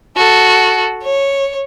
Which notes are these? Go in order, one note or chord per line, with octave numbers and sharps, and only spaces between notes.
F#4 A4
C#5